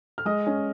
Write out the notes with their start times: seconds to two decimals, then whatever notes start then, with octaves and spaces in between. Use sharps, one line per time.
0.18 F6
0.25 G#3 D#5 D#6
0.47 C#4